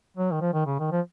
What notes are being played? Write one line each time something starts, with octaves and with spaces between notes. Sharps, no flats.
F#3
D#3
F3
D#3
C#3
D#3
F3